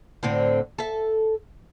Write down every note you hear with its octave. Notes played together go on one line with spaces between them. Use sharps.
A2 D3 C4
A4 E5